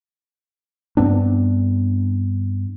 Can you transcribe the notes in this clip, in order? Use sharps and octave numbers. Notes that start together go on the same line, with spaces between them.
G2 B3 C4 D4